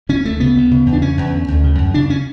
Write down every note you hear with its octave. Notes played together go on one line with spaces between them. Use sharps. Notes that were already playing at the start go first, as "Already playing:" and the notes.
D3 C#4
D2 A3
C#3 B3
D2
C#3
E2
D4
C#3 C#4
E2
D3
D2
C#3
F#2
C#3 D4
C#4